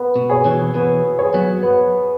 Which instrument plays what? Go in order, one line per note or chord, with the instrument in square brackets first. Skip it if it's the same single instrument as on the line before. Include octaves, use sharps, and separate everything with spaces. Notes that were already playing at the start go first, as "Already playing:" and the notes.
Already playing: [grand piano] B3
[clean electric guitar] B2
[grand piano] G#4 C#5
[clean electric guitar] B2 E3
[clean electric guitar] B2 E3 [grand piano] B3
[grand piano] G#4 C#5
[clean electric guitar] F#3 B3
[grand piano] B3